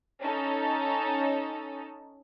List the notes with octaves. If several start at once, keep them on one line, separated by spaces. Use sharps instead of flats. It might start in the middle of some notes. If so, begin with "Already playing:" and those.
C#4 D#4 A4